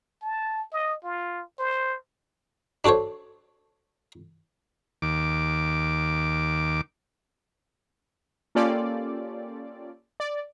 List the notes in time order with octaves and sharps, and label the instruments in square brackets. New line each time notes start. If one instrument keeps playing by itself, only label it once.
[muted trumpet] A5
D#5
F4
C5
[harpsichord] D4 F#4 A4 C5 C#5
[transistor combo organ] D#2 D6
[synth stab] A#3 C#4 F4 G4 A4 D5
D5